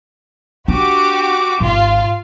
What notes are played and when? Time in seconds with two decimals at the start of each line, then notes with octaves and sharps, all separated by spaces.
0.68 D4 F#4 G4 D6
1.60 G#1 F4 F5